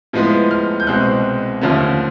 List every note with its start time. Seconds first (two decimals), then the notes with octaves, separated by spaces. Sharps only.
0.13 A2 F3 G#3 B3
0.51 F6
0.80 G6
0.87 C2 B2 G#3 C4 F#6
1.61 D#2 D3 F3 A3 C#4